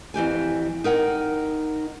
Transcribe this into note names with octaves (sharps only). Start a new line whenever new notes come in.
F2 E3 G4 G#5
D#4 A#4 F#5 G5